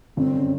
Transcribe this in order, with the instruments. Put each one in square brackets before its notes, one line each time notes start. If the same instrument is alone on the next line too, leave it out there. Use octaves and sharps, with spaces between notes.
[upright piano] G1 [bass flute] C4
[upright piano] F#2 C#3